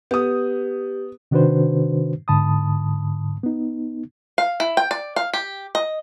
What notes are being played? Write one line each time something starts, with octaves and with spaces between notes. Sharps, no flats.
B3 G4 D#6
C3 D#3 D4 F#4 B4 C5
G#2 D3 A5 B5 D#6
B3 D#4
F5
E4
G5
D5
F5
G4
D#5